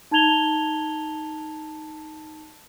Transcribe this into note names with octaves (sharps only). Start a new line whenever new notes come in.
D#4 A5 A#5 G#6 F7 G7